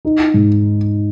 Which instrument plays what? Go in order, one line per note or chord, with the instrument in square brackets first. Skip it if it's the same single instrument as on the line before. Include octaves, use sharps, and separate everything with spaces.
[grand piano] D#4
G#2